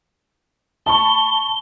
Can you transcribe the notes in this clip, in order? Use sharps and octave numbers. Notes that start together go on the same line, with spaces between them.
A5 B5 C#6 G7